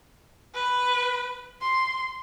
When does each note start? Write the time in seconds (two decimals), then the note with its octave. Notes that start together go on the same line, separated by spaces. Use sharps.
0.54 B4
1.61 C6